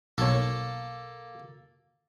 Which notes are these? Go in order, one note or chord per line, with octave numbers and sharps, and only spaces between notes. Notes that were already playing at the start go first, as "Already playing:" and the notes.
B1 A#3 A4 C#5